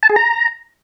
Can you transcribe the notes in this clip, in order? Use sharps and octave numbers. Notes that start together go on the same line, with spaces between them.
A5
G#4
A#5